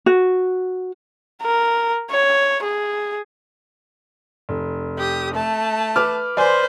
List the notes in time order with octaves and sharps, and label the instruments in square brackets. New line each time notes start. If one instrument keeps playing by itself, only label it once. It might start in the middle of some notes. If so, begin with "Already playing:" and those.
[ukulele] F#4
[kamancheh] A#4
C#5
G#4
[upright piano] F1
[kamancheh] G4 D#6
A3 A5
[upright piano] B4 D6 F6
[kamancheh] B4 C5 [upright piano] D5 G#5 C6